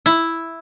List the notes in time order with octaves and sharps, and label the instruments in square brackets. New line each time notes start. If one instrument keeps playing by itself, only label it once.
[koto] E4